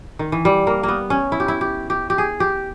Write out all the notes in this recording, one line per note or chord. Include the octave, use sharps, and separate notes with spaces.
D#3
E3
G3
A#3
A#3
B3
C#4
E4
G4
E4
G4
G4
G4
G#4
G4